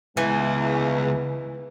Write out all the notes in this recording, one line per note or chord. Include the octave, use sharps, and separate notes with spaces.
C#2 E3 G#3 B3 E4 G#5